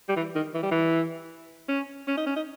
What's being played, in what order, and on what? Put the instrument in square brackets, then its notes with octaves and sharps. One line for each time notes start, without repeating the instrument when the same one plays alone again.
[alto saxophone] G3
E3
D#3
E3
G3
E3
C#4
C#4
D#4
C#4
D#4